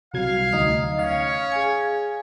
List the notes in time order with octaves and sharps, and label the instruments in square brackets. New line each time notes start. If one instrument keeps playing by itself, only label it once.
[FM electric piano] C2 F#3 G#6 [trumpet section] F5
[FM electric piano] D2 D#4 [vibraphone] D#6
[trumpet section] C#4 C#5 [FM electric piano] F5
[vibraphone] G#4 G#5